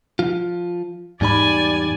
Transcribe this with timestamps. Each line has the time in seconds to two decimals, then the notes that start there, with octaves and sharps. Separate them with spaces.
0.19 F3 F4
1.21 E2 G#2 G3 D#4 D5 G#5 B5